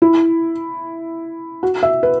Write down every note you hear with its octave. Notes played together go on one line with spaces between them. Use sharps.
E4
F#4
E5
B4